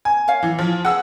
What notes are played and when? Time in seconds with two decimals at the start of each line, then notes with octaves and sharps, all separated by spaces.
0.05 G#5
0.28 C#5 F5
0.43 E3
0.59 F3
0.85 G#4 F#5 E6